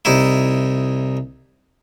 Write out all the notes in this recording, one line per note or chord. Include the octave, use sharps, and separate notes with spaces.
C2 D#4 E4